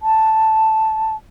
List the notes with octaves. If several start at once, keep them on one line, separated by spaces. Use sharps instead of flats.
A5